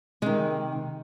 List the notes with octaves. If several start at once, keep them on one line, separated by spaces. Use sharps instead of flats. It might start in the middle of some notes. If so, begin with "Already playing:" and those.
C3 D#3 G#3